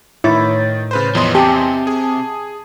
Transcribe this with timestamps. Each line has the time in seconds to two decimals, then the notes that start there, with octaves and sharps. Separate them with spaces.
0.24 A2 D#3 E4 C#5 A6
0.91 C#3 B4 C5
1.15 E2 F3 B3 D#5 C6
1.35 C3 G4 G#5 A5
1.87 G#4